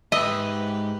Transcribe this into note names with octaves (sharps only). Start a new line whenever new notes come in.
G#2 G4 B4 D#5 E5